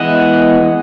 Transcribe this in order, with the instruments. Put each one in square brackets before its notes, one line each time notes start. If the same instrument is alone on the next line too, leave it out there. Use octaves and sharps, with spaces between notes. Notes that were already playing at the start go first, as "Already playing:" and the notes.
Already playing: [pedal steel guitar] E3 G#3 B3 D#5 F#5